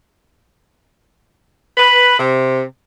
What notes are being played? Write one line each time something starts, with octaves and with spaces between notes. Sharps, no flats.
B4
C3